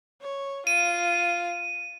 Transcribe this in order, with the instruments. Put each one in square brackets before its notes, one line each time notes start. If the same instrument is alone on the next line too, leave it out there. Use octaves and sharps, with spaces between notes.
[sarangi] C#5
[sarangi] F4 [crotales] D#7